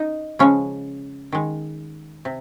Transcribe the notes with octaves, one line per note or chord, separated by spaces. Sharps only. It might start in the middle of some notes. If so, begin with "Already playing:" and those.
Already playing: D#4
C#3 F3 G#3 C#4
D#3 G#3
C3